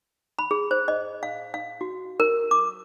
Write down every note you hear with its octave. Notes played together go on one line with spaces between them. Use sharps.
B5
G#4
C5
D#5
F5
F5
F#4
A#4
D6